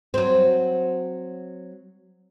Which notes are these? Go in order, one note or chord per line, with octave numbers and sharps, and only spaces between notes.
F#3 C4